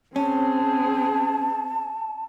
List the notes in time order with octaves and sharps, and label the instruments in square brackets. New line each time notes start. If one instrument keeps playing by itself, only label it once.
[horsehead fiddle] C4 G#4 [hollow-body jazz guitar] C#4 [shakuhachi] A5